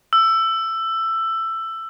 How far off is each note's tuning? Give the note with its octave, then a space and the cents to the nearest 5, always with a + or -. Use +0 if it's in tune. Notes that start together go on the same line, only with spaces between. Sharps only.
E6 +15